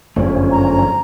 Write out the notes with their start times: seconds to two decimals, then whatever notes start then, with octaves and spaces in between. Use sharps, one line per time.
0.16 G1 F#2 D3 F3 A3 C#4
0.52 A#5